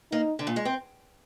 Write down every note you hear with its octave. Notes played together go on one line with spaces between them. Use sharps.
A#3 D#4
D3
A#2
G#3
C4